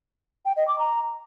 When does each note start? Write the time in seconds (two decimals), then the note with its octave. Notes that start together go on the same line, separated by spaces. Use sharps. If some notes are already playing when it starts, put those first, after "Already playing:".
0.45 G5
0.57 D#5
0.68 D6
0.79 A#5